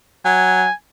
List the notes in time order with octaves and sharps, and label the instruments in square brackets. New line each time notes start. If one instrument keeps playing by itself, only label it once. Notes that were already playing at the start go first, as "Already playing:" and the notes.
[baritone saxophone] F#3 [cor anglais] G#5